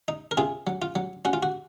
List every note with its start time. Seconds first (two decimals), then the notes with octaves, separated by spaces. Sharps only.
0.08 D#4
0.31 A#4
0.37 C3 F4 G#4
0.67 F#3
0.82 F4
0.96 F#3
1.25 C#4 F#4
1.33 F4
1.43 F#4